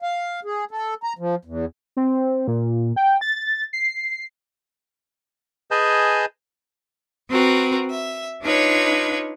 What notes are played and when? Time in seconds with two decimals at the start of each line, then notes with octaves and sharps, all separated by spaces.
0.02 F5
0.45 G#4
0.71 A4
1.03 A#5
1.19 F3
1.45 E2
1.97 C4
2.48 A#2
2.96 G5
3.21 A6
3.73 C7
5.71 G#4 B4 D#5 G#5 A5 G6
7.29 C4 F#4 A#4 B4
7.90 E5
8.43 D4 D#4 F4 B4 C#5 G#6